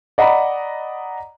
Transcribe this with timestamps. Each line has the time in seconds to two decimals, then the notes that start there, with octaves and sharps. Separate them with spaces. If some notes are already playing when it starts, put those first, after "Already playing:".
0.18 D5 D#5 F#5 A#5 B5